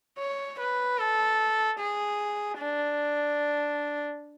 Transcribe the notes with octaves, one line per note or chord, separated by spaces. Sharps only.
C#5
B4
A4
G#4
D4